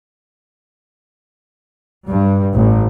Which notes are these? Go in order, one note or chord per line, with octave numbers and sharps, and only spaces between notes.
G2
A1